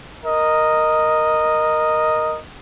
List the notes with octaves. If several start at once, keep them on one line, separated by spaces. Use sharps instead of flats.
A#4 D#5